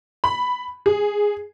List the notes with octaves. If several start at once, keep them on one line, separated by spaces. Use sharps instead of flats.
B5
G#4